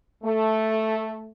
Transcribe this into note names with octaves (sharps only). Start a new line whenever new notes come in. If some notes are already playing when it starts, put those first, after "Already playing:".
A3